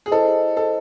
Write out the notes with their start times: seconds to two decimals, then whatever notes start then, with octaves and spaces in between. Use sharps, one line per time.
0.06 G#4
0.11 E4 A4 C5 D#5
0.57 A4